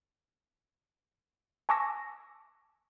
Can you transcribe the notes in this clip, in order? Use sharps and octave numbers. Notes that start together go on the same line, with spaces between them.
G#5 A5 C#6 D6 E6 A#6